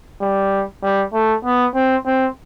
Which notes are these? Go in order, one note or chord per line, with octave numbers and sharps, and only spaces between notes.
G3
G3
A3
B3
C4
C4